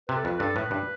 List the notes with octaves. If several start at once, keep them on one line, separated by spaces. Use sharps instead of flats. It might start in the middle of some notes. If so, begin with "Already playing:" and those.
C3 B4
A4
F2 B4
G2 A4
A2 B4
G2 B4